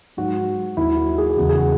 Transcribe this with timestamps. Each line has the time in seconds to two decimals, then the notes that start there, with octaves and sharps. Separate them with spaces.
0.17 G#2 F#3 F#4
0.77 D#2 D#3 F#3 E4
0.97 F#4
1.18 G#4
1.30 G#4
1.37 E2 C#3 F#3 F#4
1.49 G#4
1.58 F#4